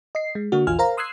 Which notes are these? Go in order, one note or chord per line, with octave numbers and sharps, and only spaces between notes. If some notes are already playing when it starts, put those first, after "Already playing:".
D#5 C7
G#3
D3 A#3 D4 F#4
A#1 E2 F4 G#5 F6
A#4 C5 F5 A#5
C6 D#6 E6 F#6 G#6 C7